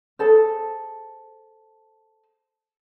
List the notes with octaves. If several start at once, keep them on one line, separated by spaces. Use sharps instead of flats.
G#4 A4 C5